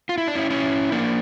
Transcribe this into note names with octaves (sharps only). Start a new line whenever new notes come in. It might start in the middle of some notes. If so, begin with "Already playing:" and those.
F4
E4
D4
C#4 E4
C#4 E4
A#3 D4